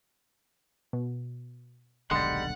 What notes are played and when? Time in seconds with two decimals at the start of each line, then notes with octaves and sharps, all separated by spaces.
0.93 B2
2.11 D#1 B1 D3 G3 G#3 F#5 C6